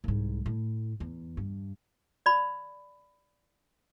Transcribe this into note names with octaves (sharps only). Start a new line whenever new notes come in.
C2 G#2
A2
E2
G2
D5 B5